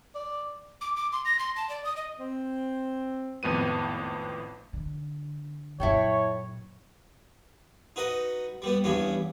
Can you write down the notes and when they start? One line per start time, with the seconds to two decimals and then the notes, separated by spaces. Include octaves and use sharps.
0.15 D5
0.81 D6
0.96 D6
1.12 C6
1.25 A#6
1.39 C6
1.56 A5
1.69 D5
1.85 D#6
1.96 D#5
2.19 C4
3.43 G#1 F2 A2 B3 D#7
4.73 D3
5.80 F#2 A#2 E4 A4 C#5 G5
7.96 D#4 F#4 B4 D#5
8.62 G3 B3
8.84 E2 G2 B3 C#4